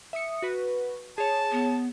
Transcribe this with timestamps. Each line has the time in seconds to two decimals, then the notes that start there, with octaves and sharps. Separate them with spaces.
0.13 E5 D#6 C#7
0.42 F#4 B4
1.18 G#4 C#5 A5
1.52 B3